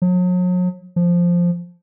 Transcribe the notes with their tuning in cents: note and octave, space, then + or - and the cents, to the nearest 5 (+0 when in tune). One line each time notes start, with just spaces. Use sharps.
F#3 -40
F3 +0